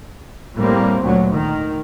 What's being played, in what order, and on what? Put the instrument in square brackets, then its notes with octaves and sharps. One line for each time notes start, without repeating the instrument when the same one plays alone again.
[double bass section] A2 G3 A#3 C4
D2 A#2 F#3
D#3